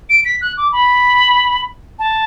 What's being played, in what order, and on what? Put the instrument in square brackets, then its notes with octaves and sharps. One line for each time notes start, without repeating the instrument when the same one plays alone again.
[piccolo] D7
B6
F#6
D6
B5
A5